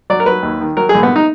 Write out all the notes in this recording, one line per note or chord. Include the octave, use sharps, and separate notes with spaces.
F#3 D5
A#4
F#3 B4
D#2
D#3
F#3 A#4
G#4
A#1
B3
D#4